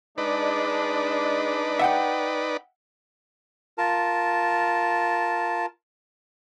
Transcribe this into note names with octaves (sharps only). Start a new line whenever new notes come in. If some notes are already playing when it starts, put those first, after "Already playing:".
G#3 D4 D#4 B4 D5
E5 F#5 G5
F4 A#4 A5